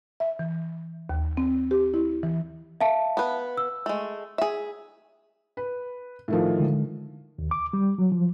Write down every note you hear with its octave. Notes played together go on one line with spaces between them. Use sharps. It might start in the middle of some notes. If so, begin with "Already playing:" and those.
E5
E3
D#2
C4
G4
E4
E3
E5 F5 A5
B3 B4
E6
G#3 A3
G#4 E5
B4
A2 D#3 F3
D3 G#3
D#2
D6
G3
F#3
F3